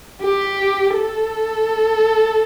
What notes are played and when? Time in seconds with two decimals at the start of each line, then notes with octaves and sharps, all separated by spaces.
0.21 G4
0.94 A4